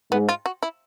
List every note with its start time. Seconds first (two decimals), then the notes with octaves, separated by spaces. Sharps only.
0.11 G#2 G#3 B3
0.29 F4
0.46 F#4
0.63 E4